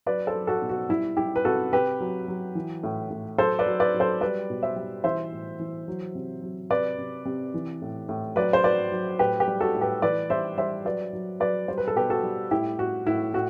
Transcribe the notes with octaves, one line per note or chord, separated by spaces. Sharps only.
F#3 B4 D5
A4 C5
F#3
F#4 A4
B2
F#4
G3 E4
G3 E4 G4
B4
C3 F#4 A4
C3 G4 B4
F#3
F#3
E3
A2
A2
F#3 A4 C5
B4 D5
F#3
B4 D5
F#3
A4 C5
G3 B4 D5
B2
C5 E5
G3
E3 C5 E5
A2
E3
F#3
C3
F#3
C3 B4 D5
C3
C3
E3
A2
A2
F#3 B4 D5
C5
F#3 B4 D5
F#3
A2 G4 B4
G4 B4
G3
F#4 A4
A2
G4 B4
E3 B4 D5
G3 C5 E5
G3 C5 E5
F#3 B4 D5
F#3
F#3 B4 D5
G3 C5
B4
A4
B2 G4 B4
F#4 A4
G3
A2 E4 G4
A2 F#4
A2 E4
A2 F#4